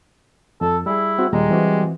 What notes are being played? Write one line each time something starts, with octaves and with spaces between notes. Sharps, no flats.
F2 A4
G3 E4 G#4
C4 F#4
D#2 A#2 G3 G#3 A#5
E3 C4 F#4